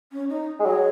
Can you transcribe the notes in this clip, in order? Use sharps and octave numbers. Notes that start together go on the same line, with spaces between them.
C#4
D#4
G#3
F#3 G#4